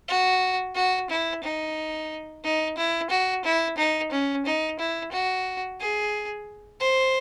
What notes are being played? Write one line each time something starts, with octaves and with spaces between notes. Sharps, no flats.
F#4
F#4
E4
D#4
D#4
E4
F#4
E4
D#4
C#4
D#4
E4
F#4
G#4
C5